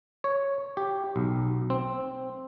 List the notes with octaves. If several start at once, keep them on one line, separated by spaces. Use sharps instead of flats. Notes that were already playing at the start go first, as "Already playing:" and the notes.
C#5
G4
B1
C4